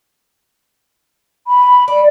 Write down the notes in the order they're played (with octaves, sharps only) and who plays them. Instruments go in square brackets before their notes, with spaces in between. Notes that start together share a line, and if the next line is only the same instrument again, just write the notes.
[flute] B5
[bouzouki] D5